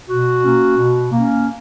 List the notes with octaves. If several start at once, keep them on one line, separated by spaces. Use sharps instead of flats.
B2 F#4
A#3 C#4
B2
A#3 C#4